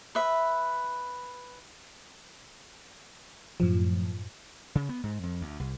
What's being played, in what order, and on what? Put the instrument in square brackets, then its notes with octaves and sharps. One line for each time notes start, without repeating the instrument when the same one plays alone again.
[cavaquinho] B4 E5
[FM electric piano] F#2 A2 F3
[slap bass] C#3
B3
G#2
F2
D2
C2